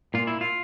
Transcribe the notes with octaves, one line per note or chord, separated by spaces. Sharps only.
A#2 F4
E4
F4